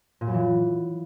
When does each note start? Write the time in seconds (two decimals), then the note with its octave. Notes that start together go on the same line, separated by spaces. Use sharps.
0.21 A#2
0.27 F#2
0.34 E3